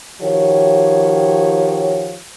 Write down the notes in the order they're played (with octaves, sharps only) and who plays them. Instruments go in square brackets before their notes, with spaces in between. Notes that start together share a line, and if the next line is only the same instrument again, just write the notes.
[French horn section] D#3 F3 F#4 G4 C#5